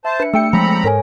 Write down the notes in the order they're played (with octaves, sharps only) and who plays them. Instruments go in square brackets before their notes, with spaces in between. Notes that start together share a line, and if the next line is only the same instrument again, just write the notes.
[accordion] C5 A5 [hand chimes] E5
[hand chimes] D4 C#7 [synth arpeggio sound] B4
[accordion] G3 [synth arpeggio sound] A3 G5 C#7 [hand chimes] E6
[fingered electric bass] F3 G#3 [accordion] C4 A#5 B5
[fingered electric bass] G#2 [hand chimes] A4 C#5 G#5 [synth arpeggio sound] A#4